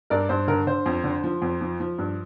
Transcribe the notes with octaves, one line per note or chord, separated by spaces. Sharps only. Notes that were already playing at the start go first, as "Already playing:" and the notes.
G2 A#4 D5
G2 C5
D3 A#4
D3 C5
F2
D3
F3
F2
F3
F3
G2